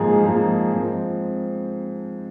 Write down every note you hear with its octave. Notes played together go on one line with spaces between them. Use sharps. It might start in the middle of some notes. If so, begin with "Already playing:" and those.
Already playing: G#2 F3 A#3 G#4
G#2 F3 A#3 G#4
G#2 F3 C4